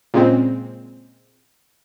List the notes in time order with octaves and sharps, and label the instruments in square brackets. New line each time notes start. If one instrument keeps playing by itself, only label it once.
[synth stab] A#2 C#3 G#3 C4